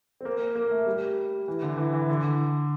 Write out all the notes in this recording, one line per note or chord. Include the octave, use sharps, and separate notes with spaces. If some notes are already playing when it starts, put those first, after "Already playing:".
C4
A#3
A#3
A3
G3
E3
D3
E3
E3
D3